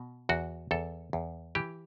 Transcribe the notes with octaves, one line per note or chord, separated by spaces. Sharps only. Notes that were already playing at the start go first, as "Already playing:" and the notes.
Already playing: B2
E2 F#4
E2 A4
E2
E3 G4